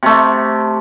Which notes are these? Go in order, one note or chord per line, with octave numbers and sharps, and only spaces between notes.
C3 A3